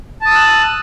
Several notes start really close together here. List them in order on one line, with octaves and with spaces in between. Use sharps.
A5 D#6 E6 F#6